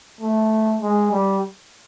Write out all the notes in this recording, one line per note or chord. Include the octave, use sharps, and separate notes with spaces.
A3
G#3
G3